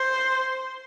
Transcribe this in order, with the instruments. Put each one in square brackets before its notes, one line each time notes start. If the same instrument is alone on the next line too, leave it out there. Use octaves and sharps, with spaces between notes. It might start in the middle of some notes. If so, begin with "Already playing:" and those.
Already playing: [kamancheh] C5